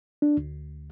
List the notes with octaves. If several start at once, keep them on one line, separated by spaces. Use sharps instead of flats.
D4
D2